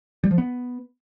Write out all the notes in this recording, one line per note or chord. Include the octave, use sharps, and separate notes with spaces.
G3
F3
B3